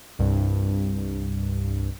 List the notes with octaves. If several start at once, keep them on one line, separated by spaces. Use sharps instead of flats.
C2 G2